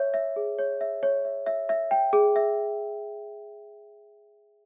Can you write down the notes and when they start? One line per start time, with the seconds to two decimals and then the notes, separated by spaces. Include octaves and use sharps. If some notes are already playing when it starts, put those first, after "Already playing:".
Already playing: C#5 E5
0.14 E5
0.36 G#4
0.59 C#5
0.81 E5
1.03 C#5
1.25 E5
1.46 E5
1.69 E5
1.91 G5
2.13 G#4
2.36 E5